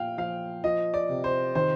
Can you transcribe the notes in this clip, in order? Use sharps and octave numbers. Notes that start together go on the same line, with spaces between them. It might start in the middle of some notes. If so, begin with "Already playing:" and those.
Already playing: A#2 F3 F5 G5
F3 F5
F3 D#5
D5
C3
C5
D#3 C5